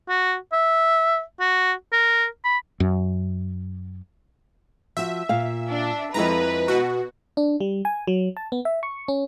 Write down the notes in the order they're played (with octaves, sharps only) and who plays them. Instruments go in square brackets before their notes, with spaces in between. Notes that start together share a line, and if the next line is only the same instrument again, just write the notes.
[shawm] F#4
E5
F#4
A#4
B5
[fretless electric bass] F#2
[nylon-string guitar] F3 F#4 [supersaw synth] E5
[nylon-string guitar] A#2 F5
[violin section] D4
[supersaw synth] F2 A#5 [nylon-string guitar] G#3 E4 D#5 [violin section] B4
[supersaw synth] B2 F#4
[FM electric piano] D4
G3
G#5
F#3
A5
B3
E5
C#6
C#4